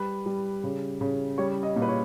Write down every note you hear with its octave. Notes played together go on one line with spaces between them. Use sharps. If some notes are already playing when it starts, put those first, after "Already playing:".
Already playing: G3 B4
G3
C#3
C#3
G3 C#5
D#5
A#2
B4
C#5